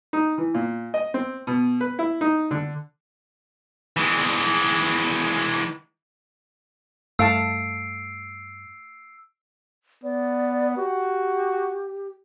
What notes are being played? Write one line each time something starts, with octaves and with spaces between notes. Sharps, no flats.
D#4
E3
A#2
D#5
C4
B2
B4
E4
D#4
D3
E3 G#3
G2 A3 F5 A5 E6 C7 D7
B3 D5
F#4 G4